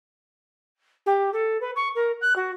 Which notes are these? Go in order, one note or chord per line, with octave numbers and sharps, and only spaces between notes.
G4
A4
B4
C#6
A#4
F#6
F#4